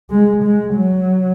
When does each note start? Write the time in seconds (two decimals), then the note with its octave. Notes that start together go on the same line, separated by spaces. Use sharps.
0.11 G#3
0.43 G#3
0.75 F#3